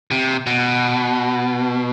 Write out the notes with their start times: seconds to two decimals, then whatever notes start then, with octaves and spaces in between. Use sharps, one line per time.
0.12 C3
0.47 B2